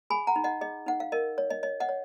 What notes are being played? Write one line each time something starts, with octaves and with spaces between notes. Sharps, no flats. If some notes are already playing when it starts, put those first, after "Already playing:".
G#4 G#5 B5
F#5 A#5
D#4
D#5 F#5
G#4 D#5
D#4 F#5
F5
A#4 D#5
C#5
D#5
C#5 D#5
D#5 F#5
C#5